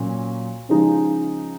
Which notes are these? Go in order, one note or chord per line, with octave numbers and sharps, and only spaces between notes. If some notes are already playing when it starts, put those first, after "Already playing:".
Already playing: A#2 F#3 C#4
C#3 F3 G#3 D#4